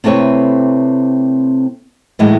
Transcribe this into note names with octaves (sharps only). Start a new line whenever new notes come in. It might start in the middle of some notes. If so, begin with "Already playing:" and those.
C3 A3 C4 E4 B4 C#5
A2 D#3 E3 F#3 G#3 A3